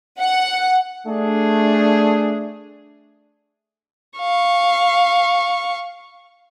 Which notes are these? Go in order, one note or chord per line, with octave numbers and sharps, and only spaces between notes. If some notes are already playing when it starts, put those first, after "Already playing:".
F#5
A3 D4 G#4
F5 C#6